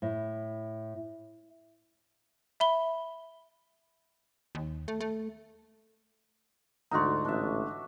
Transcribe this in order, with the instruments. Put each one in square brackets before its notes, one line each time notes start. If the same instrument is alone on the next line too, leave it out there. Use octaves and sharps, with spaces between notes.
[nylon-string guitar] A2
[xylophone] E5 B5 G7
[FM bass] D#2
A3
A3
[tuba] D2 [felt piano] G#2 D3 [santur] D#4 F4 F#4 [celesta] A#5 C6
[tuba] A1 [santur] D4 E5